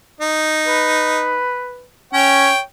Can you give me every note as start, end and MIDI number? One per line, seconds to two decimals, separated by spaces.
0.21 1.42 63
0.67 1.86 71
2.13 2.48 61
2.13 2.60 73
2.13 2.60 79